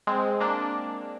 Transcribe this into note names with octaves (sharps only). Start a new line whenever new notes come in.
G#3 C4
A#3 D4